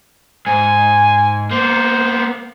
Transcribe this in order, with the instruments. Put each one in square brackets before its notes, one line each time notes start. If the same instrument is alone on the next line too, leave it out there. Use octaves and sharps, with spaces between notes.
[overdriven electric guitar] G#2 [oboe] G#5
[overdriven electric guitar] A#3 B3 [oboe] C5